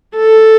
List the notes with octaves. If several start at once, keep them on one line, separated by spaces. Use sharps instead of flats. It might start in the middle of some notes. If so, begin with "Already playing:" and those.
A4